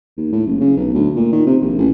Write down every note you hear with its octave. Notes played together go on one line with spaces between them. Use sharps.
D#2
A2
F#1
C#3
B1
D2
A#2
D#3
C3
A#1
A1